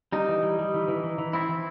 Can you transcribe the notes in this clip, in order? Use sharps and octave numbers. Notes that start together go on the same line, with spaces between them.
G3 D#4
E3
G3
G3
E3
E3
E3
E3
C4 E4
E3